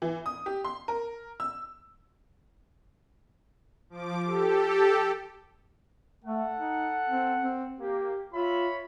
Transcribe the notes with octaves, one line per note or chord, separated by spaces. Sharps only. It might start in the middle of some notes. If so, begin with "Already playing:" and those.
E3
D#6
G4
C6
A#4
E6
F3 D6
G4 A4
A3 A4 F#5
D#4
C4
C4
A#3 G4
F4 C#5 E5 B5